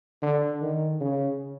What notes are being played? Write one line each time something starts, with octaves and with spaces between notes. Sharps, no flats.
D3
D#3
C#3